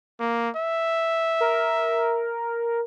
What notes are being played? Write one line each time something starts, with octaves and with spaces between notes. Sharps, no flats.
A#3
E5
A#4